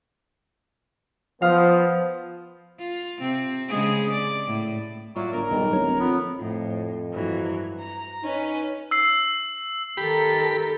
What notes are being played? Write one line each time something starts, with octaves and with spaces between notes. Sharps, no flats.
F3 B3 F5 D#6 F6
F4
C3 C4
C#3 G#3 G#4
D5
A2
A2 F#3 F4 D5
G1 A#4
B1 D#3 G3
D1 C#5
F2 B3
F2 A2
G2 E3 F#3
A#5
C#4 D#4 B4
E6 C7
D#3 G4 A4 A#4 B5